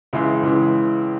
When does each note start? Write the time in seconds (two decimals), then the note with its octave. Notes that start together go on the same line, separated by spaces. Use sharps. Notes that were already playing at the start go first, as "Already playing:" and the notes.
0.13 C#2 C#3 E3 G#3 E5
0.43 C#2 C#3 E3 G#3